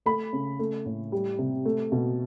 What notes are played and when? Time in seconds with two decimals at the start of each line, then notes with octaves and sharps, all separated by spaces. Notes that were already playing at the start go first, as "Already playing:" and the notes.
0.06 A3 B5
0.33 C#3
0.59 A3
0.86 A2
1.12 G3
1.39 C3
1.65 A3
1.92 B2